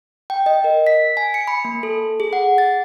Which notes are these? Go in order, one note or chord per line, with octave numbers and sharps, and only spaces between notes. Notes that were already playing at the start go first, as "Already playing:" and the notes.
G5
D#5
A#4
B6
G#5
C#7
B5
A#3
A4
G#4
F#5
A6